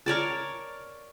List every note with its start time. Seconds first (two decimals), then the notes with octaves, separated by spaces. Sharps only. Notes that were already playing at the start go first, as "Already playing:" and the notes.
0.06 A#4 C#5 D5 A5